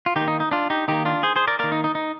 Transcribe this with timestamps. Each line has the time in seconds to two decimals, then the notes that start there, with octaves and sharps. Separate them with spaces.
0.06 F4
0.16 D#3 D#4 G4
0.21 A#3
0.28 D#4
0.40 D#4
0.51 D4 F4
0.70 D#4 G4
0.88 D#3 A#3 D#4 G4
1.05 D4 F4
1.23 G#4 C5
1.36 G#4 C5
1.47 A#4 D5
1.59 D#3 A#3 A#4 D5
1.72 D#4
1.84 D#4
1.95 D#4